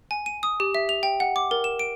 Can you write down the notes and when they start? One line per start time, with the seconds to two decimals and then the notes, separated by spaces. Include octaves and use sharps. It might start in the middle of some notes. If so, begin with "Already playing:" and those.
0.11 G#5
0.26 D#7
0.43 D#6
0.60 G4
0.75 E5
0.89 F7
1.03 G5
1.20 F#5
1.36 D6
1.51 A#4
1.64 E7
1.79 D7